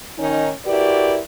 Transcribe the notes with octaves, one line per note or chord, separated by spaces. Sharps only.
D#3 C#4 D#4
E4 F#4 G4 A#4 B4 D5